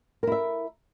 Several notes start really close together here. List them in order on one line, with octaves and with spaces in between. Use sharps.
A#4 E4 E5